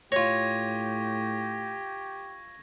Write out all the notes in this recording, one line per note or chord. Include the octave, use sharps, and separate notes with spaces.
A2 F4 G4 C#5 C#6 G#6 A#6